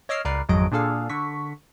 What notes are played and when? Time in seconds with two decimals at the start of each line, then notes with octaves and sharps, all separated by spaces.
0.09 C#5 D#5 D6 E6 F6 C7
0.25 C#2 A#4 B4 D5 C7
0.49 G#1 F2 F#3 G#3 D#5 D7
0.71 A#2 D4 G#4 A4 F5
1.09 D3 C#6 B6